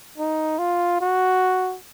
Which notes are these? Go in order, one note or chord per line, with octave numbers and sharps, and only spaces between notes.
D#4
F4
F#4